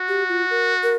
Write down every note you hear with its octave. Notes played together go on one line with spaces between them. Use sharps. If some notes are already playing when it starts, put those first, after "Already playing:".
Already playing: F#4
G4
F4
A#4
A#4